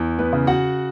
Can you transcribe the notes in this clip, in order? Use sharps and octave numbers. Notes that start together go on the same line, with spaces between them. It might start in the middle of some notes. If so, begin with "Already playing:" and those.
Already playing: E2
B3 B4
C#3
F#4 F#5